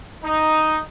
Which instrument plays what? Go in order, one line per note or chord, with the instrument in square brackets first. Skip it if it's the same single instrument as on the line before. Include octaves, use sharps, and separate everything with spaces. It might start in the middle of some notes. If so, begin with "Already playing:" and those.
[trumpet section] D#4